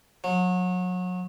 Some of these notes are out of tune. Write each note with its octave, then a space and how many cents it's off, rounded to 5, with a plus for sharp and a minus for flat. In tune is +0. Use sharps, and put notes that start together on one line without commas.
F#3 -30